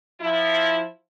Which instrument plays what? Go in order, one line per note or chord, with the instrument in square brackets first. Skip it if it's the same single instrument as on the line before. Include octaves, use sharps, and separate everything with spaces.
[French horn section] F3 E4